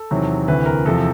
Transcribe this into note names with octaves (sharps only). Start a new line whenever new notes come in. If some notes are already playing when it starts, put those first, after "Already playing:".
Already playing: A4
E2 C3 D#3 F#3
D2 C3 E3 B4
A#4
E2 C3 F3 A4